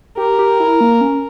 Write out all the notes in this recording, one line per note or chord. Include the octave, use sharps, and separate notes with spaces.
G4 A#4
G4
E4
A#3
C#4